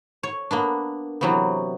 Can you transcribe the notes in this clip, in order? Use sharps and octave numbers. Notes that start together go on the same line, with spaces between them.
C#5
A#3 B3 D4
C3 E3 F#3 A#3 B3